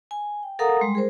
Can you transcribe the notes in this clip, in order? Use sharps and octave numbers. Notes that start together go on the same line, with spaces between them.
G#5
G5
A4 A#4 F5 F#5 A#5 D#6
G3 G#3 C6
G#4 A#4 C5